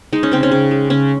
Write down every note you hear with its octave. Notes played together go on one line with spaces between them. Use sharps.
G#3 D#4
C#4
C#3 C4
C#4
C#3
G#3
C#3 C#4